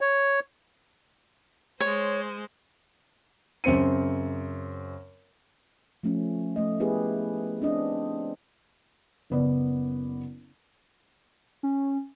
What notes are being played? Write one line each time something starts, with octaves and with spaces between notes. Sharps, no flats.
C#5
G#3 C5 C#5
F#2 C#3 C4 C#7 D#7
F3 A3 C#4
A3 D#5
B3 E4 G4 G#4 B4
C4 D4 D#5
F#1 B3 D5
C#4